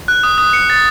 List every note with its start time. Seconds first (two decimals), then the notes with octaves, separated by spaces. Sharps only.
0.08 F#6
0.23 D#6
0.38 D#6
0.53 C#7
0.70 A6